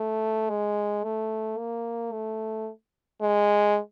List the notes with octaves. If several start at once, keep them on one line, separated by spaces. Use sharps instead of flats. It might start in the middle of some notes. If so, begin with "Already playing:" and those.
Already playing: A3
G#3
A3
A#3
A3
G#3